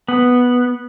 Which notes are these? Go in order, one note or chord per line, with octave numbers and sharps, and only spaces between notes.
B3